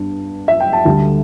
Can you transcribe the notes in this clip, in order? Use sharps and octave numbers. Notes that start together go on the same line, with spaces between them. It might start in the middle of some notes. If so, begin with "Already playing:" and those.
Already playing: G2 G3 B3 D4
E5
G5
A5
D2 D3 G3